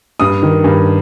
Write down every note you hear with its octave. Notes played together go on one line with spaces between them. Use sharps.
G2 D#6
D#3
G2